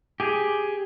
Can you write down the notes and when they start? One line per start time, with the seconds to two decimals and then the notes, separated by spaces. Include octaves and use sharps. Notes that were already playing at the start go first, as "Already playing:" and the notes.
0.20 G4 G#4